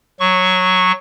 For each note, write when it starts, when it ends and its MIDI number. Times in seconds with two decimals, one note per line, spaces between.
0.20 0.92 54
0.20 0.92 85